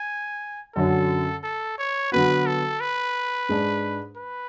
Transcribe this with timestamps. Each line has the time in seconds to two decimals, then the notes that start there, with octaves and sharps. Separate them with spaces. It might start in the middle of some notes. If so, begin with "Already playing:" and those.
Already playing: G#5
0.75 F#2 D3 F#3 C#4 A4
1.44 A4
1.78 C#5
2.12 D3 F#3 B3 F#4 B4
2.46 A4
2.80 B4
3.49 G#2 G#3 D4
4.17 B4